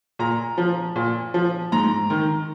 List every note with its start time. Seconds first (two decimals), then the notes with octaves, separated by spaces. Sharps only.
0.19 A#2 A#5
0.58 F3
0.96 A#2
1.34 F3
1.72 G#2 A#5
2.10 D#3